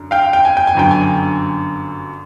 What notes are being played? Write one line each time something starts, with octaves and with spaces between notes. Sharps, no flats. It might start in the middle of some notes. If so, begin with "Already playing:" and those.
Already playing: F#2 D3
F5 G5
G5
G#5
G5
G#5
G1 F#2 D3 G5
G#5